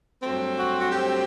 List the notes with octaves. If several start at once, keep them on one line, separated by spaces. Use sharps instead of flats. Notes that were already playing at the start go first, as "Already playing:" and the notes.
G2 F#3 A3 C4
F#4
F#4
G4